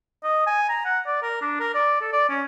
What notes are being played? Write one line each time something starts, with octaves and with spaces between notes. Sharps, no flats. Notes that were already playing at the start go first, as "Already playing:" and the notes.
D#5
G#5
A#5
F#5
D5
A#4
D4
A#4
D5
A4
D5
C#4